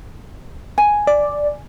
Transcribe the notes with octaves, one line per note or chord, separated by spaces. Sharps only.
G#5
D5